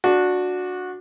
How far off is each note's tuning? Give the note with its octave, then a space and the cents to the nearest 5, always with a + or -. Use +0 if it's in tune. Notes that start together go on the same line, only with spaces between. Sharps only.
D4 +0 F#4 -20